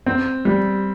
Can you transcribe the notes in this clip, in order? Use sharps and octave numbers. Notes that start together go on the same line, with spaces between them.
C4
G3